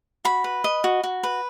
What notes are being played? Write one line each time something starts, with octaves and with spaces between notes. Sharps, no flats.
F#4 B5
B4
D#5
F#4
F#4
B4